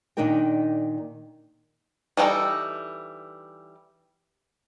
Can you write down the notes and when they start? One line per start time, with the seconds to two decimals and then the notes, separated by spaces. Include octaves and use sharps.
0.17 A#2 D#3 D4 D#4 A#4 G5
2.17 E3 G3 D4 D#4 A4